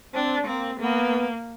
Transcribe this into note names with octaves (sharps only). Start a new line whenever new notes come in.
C4 D4
A#3 C4
A#3 B3